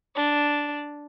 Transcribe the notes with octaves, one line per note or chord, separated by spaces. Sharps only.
D4